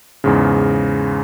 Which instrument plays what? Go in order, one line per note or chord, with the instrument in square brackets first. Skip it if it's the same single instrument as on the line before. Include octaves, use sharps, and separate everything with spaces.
[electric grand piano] E2 G#2 C#3